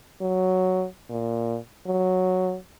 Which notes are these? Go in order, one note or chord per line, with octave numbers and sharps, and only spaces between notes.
F#3
A#2
F#3